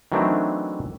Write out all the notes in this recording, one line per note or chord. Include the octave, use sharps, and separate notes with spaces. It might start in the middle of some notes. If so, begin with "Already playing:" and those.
D#3 E3 F#3 A3 C4 D4